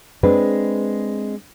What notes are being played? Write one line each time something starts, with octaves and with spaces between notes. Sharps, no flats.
G#3 C4 D4 B4